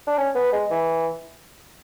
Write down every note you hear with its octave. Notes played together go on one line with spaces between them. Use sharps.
D4
C#4
B3
G#3
E3